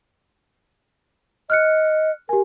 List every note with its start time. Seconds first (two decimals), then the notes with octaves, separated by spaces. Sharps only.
1.50 D#5 F6 F#6 C#7
2.29 G4 A#4 G#5